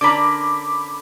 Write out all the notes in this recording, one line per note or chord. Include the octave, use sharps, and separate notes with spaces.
D3 C#4 A#4 B5 D6